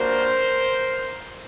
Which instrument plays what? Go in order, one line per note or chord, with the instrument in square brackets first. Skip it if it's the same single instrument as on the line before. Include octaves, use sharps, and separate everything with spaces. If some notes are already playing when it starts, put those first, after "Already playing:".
Already playing: [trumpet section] G3 A#3 D4 F#4 A#4 C5